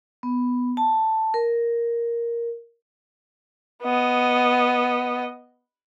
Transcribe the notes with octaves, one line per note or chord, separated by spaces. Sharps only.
B3
A5
A#4
B3 D#5